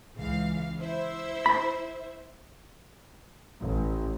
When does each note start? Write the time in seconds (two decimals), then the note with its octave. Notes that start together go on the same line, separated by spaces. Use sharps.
0.17 C#2 E3 F5
0.80 E4 C5 E5
1.46 B5
3.59 A1